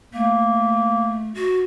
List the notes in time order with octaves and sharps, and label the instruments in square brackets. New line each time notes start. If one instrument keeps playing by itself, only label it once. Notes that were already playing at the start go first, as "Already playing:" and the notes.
[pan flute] A3 [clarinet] A#3
[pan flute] F#4